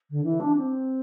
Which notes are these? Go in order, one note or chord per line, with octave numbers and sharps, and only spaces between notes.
D3
E3
D4
C4